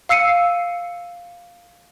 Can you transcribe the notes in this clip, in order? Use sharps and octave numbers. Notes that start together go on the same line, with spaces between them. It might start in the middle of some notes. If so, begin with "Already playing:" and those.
F5 E6 C7 C#7 D#7